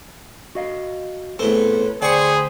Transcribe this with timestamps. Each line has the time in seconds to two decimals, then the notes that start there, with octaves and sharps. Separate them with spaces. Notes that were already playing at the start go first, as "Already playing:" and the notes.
0.55 F#4 D#5 F5
1.39 A2 B3 C4 G#4 A4 B4 C#5
2.02 D2 G#4 C5 D5 G5 B5 C#6